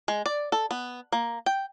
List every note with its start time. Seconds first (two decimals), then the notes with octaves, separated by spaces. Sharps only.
0.08 G#3
0.26 D5
0.52 A4
0.71 B3
1.12 A#3
1.46 G5